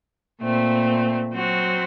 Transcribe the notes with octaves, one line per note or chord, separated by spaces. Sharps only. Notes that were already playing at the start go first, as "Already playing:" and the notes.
A#2 A3 C4
F#3 C4 F#4